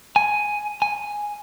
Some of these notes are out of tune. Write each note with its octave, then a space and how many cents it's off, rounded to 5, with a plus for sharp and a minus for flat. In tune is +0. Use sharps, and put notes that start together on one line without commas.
G#5 +5
G#5 +0